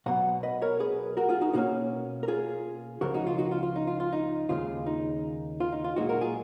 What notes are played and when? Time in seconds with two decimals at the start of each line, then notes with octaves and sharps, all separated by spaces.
0.06 B1 B2 F#3 F#5 A#5
0.43 B4 D#5
0.62 A#4 C#5
0.80 G#4 B4
1.17 F#4 A#4
1.29 F4 G#4
1.41 D#4 F#4
1.53 B2 A#3 C#4 D#4 F#4
2.23 A#4
2.28 F4 G#4
3.01 C#2 C#3 F3 F#4 A#4
3.14 D#4 F#4
3.27 F4
3.38 D#4 F#4
3.51 F4
3.63 F4
3.76 D#4
3.87 F4
4.00 F4
4.12 D#4
4.49 D#2 C#3 G#3 F4
4.86 D#4
5.60 F4
5.72 D#4
5.84 F4
5.96 B1 A#2 G#3 D#4 F#4
6.09 F#4 A#4
6.21 F4 G#4